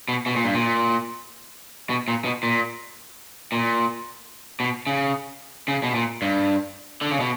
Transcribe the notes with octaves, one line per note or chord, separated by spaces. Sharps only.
B2
B2
A#2
G2
A#2
B2
A#2
B2
A#2
A#2
B2
C#3
C#3
B2
A#2
G2
D3
C#3
B2